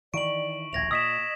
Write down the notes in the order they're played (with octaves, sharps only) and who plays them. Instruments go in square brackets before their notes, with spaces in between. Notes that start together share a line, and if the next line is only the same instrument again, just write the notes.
[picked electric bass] D#3 E3 [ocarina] D5 [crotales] C#6 [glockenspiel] D7 F#7
[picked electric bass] D1 A#1 D#2 [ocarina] E5 [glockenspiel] G#6 A#6 F7
[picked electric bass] A#2 [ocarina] D#5 [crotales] D#6 B6 E7 [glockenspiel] E6